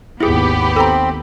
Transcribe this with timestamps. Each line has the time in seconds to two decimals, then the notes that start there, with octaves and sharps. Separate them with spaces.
0.21 G#1 D#2 B3 E4 G4 G#4 B5
0.76 C4 A4 A#5